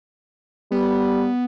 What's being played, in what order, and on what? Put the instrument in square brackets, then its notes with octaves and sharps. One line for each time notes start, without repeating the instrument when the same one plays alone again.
[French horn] G3 [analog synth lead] B3